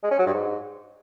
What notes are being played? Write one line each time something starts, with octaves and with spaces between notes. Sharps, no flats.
G#3
C#4
F#3
G2
G#2